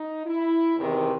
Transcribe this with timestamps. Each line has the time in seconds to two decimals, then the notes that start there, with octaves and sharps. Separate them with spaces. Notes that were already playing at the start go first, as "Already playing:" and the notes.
Already playing: D#4
0.27 E4
0.77 E2 C3 D#3